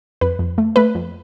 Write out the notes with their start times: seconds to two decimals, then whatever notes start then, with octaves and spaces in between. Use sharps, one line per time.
0.21 F2 B4
0.39 F2
0.58 A3
0.76 A3 B4
0.95 F2